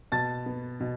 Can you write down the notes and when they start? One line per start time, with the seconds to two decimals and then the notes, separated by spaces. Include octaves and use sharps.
0.12 B2 A5 A6
0.46 B3
0.80 B2